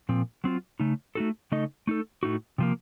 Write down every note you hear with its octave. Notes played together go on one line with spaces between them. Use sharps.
A#2 F3 C4
F#3 C4 F4
C#3 A3 D#4
A3 D#4 F#4 A4
C#3 A3 D#4 A4 D#5
A3 D#4 A4
A2 A3 D#4 F#4
C3 F3 A#3